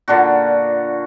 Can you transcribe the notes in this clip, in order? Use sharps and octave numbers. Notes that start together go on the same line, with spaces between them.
A#2 D3 D4 F#4